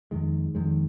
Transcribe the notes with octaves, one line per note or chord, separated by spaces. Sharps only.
F2 D#3 G#3
F2 D#3 G#3